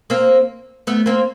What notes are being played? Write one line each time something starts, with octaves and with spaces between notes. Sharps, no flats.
A#3 C4
A3 B3
A#3 C4